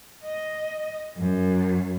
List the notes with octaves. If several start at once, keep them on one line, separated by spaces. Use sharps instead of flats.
D#5
F#2